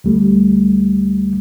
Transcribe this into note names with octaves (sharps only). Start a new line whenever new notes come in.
D2 G3 A3